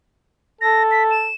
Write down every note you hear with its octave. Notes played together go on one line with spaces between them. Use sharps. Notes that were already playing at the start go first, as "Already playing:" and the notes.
A4 A#6
B6
E7